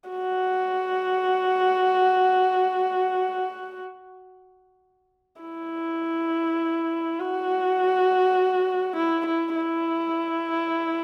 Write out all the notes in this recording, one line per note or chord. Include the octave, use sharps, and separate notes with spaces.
F#4
E4
F#4
E4
E4
E4